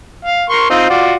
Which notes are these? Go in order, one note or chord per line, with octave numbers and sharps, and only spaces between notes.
F5
A#4 C6 C#6
C4 D#4 F4
F4 F#4 D5